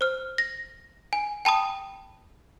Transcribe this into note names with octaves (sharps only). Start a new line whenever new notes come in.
C5 F6
A#6
G#5
G5 A5 B5 D#6